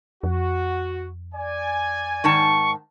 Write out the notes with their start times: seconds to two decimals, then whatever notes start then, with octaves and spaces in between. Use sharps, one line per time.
0.23 F2 F#4
1.34 D5 G#5
2.24 G#2 D#3 A5 C#6